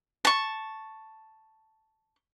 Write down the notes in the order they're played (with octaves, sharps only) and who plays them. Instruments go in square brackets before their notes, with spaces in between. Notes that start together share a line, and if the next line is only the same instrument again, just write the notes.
[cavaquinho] A5 C#6